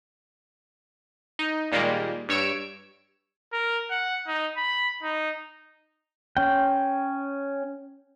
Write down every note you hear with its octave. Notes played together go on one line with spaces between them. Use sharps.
D#4
A#2 D#3 G3 G#3 A#3
G2 C#5 E6 D7
A#4
F#5
D#4
B5
D#4
C#4 G5